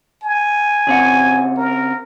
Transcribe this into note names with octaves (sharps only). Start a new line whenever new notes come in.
G#5
C#3 C4 F#5
A#4